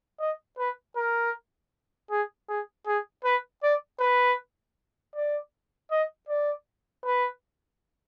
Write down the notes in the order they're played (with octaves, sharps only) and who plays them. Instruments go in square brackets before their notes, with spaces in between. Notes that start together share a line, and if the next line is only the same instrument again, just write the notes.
[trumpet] D#5
B4
A#4
G#4
G#4
G#4
B4
D5
B4
D5
D#5
D5
B4